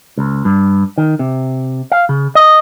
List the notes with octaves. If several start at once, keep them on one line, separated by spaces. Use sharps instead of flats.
C#2
G2
D#3
C3
F5
C#3
D#5